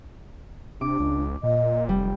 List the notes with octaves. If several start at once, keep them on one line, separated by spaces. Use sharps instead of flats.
C3 D4 D6
C#2
A#2 D#5
F1 G3 G5